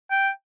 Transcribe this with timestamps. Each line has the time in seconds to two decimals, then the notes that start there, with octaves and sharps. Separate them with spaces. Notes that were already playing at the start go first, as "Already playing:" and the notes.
0.10 G5